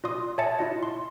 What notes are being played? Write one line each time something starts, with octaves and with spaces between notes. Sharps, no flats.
F4 D5 C6 D#6
C#5 E5 G#5 A5 A6 C#7
E4 F4 D#5
C6